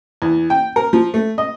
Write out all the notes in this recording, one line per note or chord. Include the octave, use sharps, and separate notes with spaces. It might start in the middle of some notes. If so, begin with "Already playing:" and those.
E2
G5
A#4
F3
A3
D#5